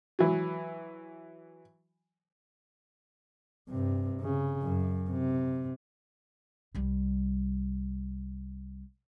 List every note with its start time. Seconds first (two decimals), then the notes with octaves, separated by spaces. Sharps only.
0.19 E3 F#3
3.70 G2 C3
4.21 C#3
4.63 F#2
5.11 C3
6.75 C2 G3